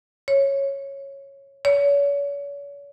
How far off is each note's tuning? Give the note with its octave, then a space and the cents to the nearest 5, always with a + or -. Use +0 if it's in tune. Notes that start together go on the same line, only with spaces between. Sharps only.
C#5 -10
C#5 +40